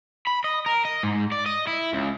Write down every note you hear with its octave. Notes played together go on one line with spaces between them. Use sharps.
B5
D#5
A#4
D#5
G#2
D5
D#5
E4
C#2